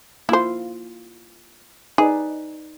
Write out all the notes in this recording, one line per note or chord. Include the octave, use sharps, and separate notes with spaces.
A#3 E4 F4 C5
D#4 G#4 B4 D5